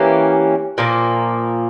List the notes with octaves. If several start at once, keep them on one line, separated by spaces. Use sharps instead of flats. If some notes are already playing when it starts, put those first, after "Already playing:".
Already playing: E3 A#3 C#4 G4
A#2 F3 A#3